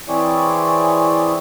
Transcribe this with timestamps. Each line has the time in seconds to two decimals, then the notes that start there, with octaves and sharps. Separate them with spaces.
0.08 E3 C4 E4 G#4 C#5 D5